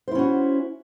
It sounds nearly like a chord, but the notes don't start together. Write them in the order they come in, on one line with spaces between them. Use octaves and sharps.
C5 E4 C#4 F#4